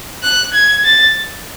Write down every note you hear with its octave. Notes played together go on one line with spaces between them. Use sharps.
F#6
G#6
A6